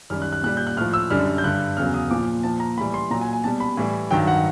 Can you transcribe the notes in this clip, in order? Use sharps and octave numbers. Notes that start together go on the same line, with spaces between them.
F#2 D#3 G3 F6
F#6
F#6
A#2 G3 F#6
G6
F#6
A2 F3 F6
E6
F#2 D3 G3 F6
G6
G2 D3 G3 F#6
E2 C#3 F#3 F6
D#6
A#2 F3 D6
A#2 F3 A5
A#5
A2 E3 G3 B5
C6
A#2 F#3 A#5
G#5
G#5
B2 G3 A5
B5
A2 E3 G3
G2 D#3 F#3 G5
F#5